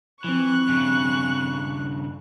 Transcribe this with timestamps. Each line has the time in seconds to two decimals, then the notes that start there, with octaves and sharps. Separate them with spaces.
0.24 E3 F3 C4 C#6 F#6
0.68 G2 C#3